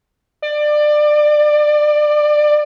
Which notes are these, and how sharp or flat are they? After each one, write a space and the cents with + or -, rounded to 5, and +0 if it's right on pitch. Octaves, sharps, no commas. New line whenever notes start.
D5 +25